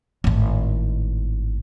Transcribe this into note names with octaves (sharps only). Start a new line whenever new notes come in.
G#1 A2